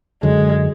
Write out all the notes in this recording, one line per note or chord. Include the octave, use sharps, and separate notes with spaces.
F#2 D3 F#3 G#3